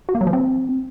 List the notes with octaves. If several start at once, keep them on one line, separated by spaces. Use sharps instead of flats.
F#4
A#3
F#3
F3
C4